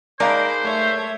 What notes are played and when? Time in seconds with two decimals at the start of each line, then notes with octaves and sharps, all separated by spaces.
0.20 G#3 D#4 A#4 C5 D5 F5 B5
0.63 A3 C#5 G#6